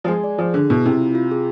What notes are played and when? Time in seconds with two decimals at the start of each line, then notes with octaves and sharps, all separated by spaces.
0.04 F3
0.08 G#3 G#5
0.24 D5
0.38 F3 G#4
0.54 D3 G#4
0.70 B2 E4
0.85 C3 E4
1.00 F4
1.15 F4
1.31 G#4